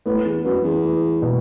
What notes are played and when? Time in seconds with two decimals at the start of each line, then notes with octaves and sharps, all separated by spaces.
0.06 A2 B3
0.25 E2
0.44 F#2 B3
0.64 E2
0.84 B3
1.22 B2